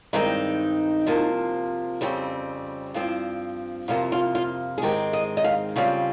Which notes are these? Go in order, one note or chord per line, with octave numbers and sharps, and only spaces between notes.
G2 D#3 G#3 C4 D#4
C3 F3 A#3
F2 C#3 G3 C4
G2 F3 C4
F2 C3 F3 A#3 F4
F4
F4
G#4
G#2 D#3 G#3 C4 G4
D#5
D#5
F5
F2 C#3 G3 C4 F5